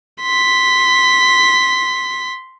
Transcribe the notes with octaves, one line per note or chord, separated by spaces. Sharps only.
C6 B6